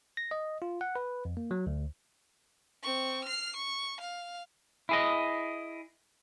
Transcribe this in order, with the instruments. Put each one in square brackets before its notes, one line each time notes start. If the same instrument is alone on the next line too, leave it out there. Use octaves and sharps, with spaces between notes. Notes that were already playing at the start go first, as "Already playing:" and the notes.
[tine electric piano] A#6
D#5
F4
F#5
B4
F2
A#3
F#3
D2
[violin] C4 C#6
F6 C7
C#6
F5
[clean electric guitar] E4 G#4 D#5